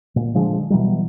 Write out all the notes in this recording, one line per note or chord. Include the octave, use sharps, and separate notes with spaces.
A#2
D3 F3 G#3
B2 E3 F#3 G3